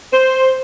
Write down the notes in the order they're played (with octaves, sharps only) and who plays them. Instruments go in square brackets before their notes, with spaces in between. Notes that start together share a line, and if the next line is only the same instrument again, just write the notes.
[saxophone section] C5